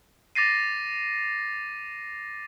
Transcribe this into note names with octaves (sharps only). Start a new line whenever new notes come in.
D6 A6 A#6 C7 D#7